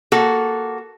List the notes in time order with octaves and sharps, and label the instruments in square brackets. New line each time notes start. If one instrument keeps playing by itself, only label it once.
[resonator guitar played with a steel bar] A#3 F#4 A4